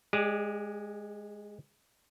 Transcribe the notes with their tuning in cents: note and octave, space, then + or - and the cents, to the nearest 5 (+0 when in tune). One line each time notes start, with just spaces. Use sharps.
G#3 +0 G4 +40 D5 +15